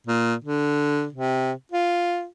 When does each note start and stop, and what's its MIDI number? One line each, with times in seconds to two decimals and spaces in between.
0.07 0.34 46
0.44 1.07 50
1.13 1.52 48
1.72 2.26 65